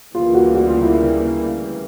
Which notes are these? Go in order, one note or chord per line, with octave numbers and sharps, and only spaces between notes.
D2 C#3 E3 G3 A#3 F4
F#4
F#4
F4
E4